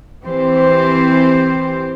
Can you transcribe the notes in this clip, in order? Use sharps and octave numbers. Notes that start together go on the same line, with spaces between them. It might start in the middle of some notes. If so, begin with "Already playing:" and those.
E3 C4 G4 C5